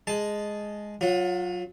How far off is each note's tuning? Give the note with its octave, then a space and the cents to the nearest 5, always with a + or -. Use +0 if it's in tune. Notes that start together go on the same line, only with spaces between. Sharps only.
G#3 +0 A5 -15
F#3 -10 F4 +25